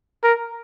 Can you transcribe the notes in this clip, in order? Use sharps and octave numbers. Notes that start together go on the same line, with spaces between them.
A#4